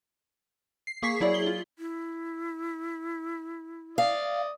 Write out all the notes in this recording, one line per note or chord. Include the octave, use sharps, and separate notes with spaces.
C7
A#3 G#4 C#6 B6 C7
F#3 E4 G#4 D5
G7
F4
E4
D5 F5 D#6